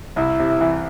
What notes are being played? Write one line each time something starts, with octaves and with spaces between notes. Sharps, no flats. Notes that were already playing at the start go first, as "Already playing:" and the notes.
C2 E4
C3
E3